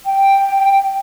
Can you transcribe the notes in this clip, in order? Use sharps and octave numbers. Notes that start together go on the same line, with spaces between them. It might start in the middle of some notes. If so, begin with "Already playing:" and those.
G5